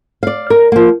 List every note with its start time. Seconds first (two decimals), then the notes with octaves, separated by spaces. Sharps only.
0.23 D5 F5
0.50 A#4
0.72 F3 A#3